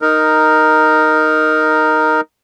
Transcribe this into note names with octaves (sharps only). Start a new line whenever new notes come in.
D#4 A#4